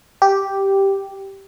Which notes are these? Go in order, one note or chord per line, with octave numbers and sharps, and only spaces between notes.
G4